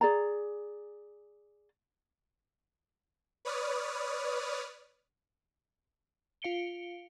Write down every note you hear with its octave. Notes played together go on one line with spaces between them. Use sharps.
G#4 D5 A#5
B4 C#5 D5 D#6 F6
F4 F5 C#7 D7 G7